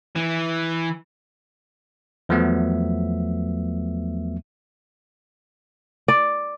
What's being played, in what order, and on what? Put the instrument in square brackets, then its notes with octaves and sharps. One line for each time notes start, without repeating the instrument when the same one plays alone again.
[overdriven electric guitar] E3
[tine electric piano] E2 F3 F#3 A3 B3 E5
[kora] D5